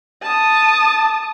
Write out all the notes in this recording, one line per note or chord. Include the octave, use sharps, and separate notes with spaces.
A5 D#6